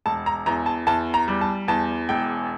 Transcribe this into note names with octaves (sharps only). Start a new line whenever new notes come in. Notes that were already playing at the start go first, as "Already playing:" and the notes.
E1 A5
A#5
E2 A#5
A5
E2 A5
A#5
G3
A5
E2 A5
E1 G5